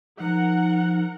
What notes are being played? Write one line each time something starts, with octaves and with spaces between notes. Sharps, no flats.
F3 D#4 A#4 F#5